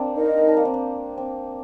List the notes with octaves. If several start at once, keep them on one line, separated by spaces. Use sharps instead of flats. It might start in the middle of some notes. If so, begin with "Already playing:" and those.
Already playing: A#3 C4 D4
D#4 A#4 D#5
D4
A#3
C4
D4
C4